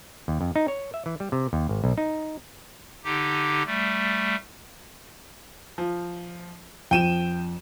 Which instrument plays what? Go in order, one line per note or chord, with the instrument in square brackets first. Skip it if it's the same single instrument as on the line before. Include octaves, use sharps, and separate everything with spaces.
[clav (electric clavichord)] D#2
F2
D#4
C#5
E5
E3
G3
C3
D#2
G#1
B1
D#4
[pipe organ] D3 D#4 G4
G3 A3
[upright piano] F3
[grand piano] F2 F3 [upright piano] G5 D#7 E7